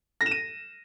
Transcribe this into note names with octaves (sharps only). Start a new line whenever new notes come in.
A#6
E7
D#7